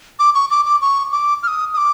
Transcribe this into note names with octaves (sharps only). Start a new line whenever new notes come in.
D6
C#6
D6
D6
C#6
D6
F6
D#6
D#6
D6